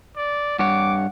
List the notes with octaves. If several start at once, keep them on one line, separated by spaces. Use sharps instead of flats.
D5
G2 C#5 F#5 D6